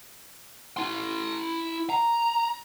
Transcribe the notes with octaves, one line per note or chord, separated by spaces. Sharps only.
E4 C6
A#5